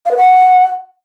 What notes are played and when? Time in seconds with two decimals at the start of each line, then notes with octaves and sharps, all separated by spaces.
0.05 F5
0.11 B4
0.17 F#5